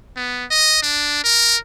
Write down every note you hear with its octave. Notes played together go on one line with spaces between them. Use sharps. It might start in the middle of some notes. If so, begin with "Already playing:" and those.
B3
D#5
D4
A#4